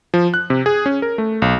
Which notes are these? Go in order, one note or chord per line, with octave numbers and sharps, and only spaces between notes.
F3
F#6
C3
G#4
C#4
A#4
A3
B1